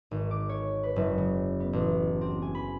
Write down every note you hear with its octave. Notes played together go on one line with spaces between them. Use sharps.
G#1
D6
C#5
B4
F#1
C#3
B3
A1
C4
G#5
B5